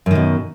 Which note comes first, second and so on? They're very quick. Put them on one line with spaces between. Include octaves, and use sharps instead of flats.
F#2 D#3 B2